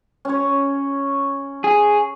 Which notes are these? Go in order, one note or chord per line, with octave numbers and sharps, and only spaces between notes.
C#4 C#5
G#4